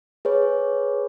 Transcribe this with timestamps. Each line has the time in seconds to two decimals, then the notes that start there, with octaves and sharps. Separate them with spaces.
0.25 G#4 B4 C#5